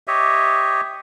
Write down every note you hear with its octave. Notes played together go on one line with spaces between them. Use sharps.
G4 C#5 D#5 E5